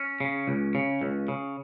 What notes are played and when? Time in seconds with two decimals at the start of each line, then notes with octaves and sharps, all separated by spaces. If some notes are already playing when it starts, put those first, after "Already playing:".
Already playing: C#4
0.20 C#3
0.48 C#2
0.75 C#3
1.01 C#2
1.28 C#3